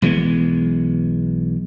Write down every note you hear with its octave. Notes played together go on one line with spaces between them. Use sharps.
B1 E3 G#3 B3